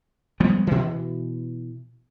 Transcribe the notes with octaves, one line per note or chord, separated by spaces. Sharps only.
F3 G3 G#3 B3
B2 E3